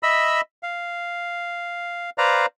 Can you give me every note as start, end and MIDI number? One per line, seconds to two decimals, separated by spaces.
0.03 0.41 75
0.03 0.41 76
0.03 0.41 83
0.03 0.41 88
0.63 2.10 77
2.18 2.46 71
2.18 2.46 72
2.18 2.46 74
2.18 2.46 77
2.18 2.46 82